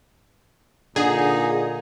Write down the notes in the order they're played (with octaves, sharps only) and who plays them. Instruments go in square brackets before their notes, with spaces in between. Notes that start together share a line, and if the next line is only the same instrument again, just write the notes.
[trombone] A#2 [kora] D3 [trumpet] D#4 [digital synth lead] G#4